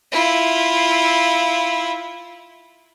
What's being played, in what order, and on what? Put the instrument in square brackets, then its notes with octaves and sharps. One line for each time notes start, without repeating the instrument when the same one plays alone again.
[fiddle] E4 F4